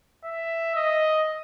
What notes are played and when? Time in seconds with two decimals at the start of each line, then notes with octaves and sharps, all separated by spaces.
0.25 E5
0.76 D#5